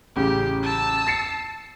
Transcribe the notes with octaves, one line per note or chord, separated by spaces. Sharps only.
A1 C#3 G4
A5 E6
A6 C7 C#7